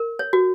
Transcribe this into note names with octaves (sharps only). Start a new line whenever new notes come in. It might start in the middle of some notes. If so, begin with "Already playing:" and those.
Already playing: A#4
C#5
F#4